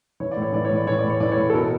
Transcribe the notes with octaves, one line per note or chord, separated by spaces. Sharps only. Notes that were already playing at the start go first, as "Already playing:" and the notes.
E3 C#5
D5
A2
C#5
E3 D5
C#5
A2
D5
E3 C#5
A2 D5
C#5
E3 D5
A2 C#5
A4
B2 A#4